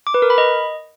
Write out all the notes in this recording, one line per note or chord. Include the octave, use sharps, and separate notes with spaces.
D6
B4
A#4
B5
D#5